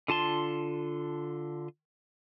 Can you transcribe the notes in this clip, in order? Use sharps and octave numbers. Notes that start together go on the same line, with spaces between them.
D3 F4 A5 C6